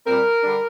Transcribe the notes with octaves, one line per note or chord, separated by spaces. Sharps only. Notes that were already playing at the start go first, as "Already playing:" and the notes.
A#2 G3 C4 A#4
D3 G3 D4